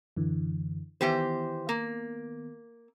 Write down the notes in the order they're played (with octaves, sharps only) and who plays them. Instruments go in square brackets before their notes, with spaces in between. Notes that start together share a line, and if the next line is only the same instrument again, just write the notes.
[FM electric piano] F#2 D3 E3
[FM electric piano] D#3 B3 [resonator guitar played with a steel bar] E3 G4 C5
[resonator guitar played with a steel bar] A#3